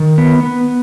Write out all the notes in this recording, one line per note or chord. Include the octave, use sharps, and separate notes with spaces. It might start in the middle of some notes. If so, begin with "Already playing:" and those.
Already playing: D#3
B3
B3